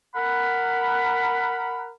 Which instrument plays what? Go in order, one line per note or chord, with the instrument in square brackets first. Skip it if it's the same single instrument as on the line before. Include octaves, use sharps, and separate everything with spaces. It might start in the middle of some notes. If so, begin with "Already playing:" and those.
[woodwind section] A#4 F#5 B5